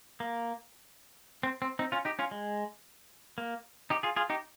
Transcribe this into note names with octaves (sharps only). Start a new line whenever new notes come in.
A#3
C4
C4
C4 D#4
C#4 F4
D#4 G4
C#4 F4
G#3
A#3
D#4 G4
F4 G#4
F4 G#4
D#4 G4